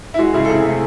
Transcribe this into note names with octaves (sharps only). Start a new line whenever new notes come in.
E4
G#3 F#4
C#3 E4 G#4
A4
C3 E4 G#4
A3